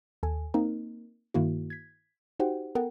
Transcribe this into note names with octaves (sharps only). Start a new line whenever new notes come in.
D#2 A4 G#5
A#3 C4 D#4 A#4
G2 D#3 A#3 E4 F#4
G#6 B6
D#4 F#4 G4 C5 F#5 G5
B3 A4 A#4 F#5 G5